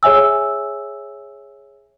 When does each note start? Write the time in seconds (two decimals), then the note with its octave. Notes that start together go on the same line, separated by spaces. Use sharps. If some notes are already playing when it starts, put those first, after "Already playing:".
0.03 G#4 C#5 E5 G#5 E6